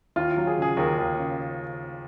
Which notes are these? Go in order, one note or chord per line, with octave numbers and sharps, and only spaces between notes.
D#2 F4
F#3
G#4
C#3 G#4
D#2 A#4
D#2
C#3